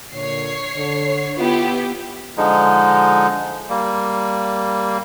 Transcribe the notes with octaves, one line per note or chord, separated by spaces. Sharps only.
A#2 D3 C#5 C7
D3
B3 E4 F4 G4
D3 F3 G#3 D#4
G3 A#3